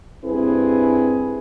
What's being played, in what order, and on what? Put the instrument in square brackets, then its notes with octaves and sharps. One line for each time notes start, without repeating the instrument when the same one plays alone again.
[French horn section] G2 C4 E4 G#4 B4